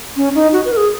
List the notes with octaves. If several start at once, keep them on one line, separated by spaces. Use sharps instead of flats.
C#4
D#4
F#4
B4
A#4
G#4